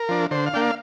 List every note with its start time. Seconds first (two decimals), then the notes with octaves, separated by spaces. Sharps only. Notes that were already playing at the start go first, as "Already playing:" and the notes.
Already playing: A#4
0.09 F3 D4
0.31 D3 C5
0.46 F5
0.53 A#3 D4 G5
0.61 F5